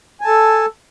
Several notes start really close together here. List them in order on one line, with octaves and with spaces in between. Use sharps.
G#5 A5 A4